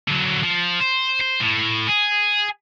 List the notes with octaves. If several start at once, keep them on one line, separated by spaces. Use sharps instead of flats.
D3 F#3
F3
C5
C5
A2
G#4